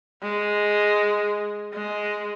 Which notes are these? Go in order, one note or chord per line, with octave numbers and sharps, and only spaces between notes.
G#3
G#3